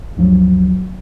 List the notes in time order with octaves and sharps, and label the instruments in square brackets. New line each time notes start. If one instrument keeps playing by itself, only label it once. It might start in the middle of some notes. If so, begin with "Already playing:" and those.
[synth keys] D2 G2 F3 F#3